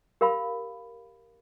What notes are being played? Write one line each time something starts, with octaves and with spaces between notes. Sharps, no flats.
G4 A#4 F5 B5